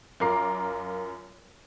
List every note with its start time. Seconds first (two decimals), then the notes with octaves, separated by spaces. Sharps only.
0.20 F#2 F4 A#4 A#5 D6 C7